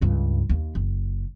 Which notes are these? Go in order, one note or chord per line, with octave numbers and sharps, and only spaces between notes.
C#2 G2
D#2
F#1